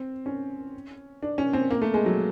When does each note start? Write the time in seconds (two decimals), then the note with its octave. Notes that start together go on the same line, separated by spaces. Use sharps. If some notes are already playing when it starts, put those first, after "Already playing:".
Already playing: C4
0.26 C#4
1.22 D4
1.38 C#4
1.53 C4
1.71 A#3
1.82 A3
1.94 G#3
2.06 F#3